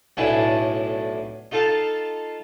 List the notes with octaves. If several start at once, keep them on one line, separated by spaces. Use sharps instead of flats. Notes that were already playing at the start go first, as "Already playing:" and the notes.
B1 A2 D4 E4 G#5 A5
D#4 F4 A4 F5 A5